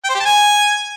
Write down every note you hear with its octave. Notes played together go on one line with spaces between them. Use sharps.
G5
C5
G4
A5
G#5